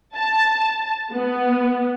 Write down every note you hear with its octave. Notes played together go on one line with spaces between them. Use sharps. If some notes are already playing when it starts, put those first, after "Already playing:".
A5
B3